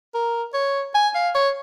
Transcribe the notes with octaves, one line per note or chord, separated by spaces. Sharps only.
A#4
C#5
G#5
F5
C#5